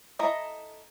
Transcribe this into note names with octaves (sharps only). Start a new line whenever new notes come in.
E4 A4 D#5 A#5